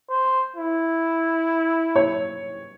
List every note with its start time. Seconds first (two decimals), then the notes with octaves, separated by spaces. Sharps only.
0.10 C5
0.56 E4
1.96 C#5